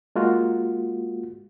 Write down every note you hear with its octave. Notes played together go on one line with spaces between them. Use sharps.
G#3 A#3 F4 F#4